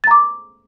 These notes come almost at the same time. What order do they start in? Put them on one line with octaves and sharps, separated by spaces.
A6 A#5 D6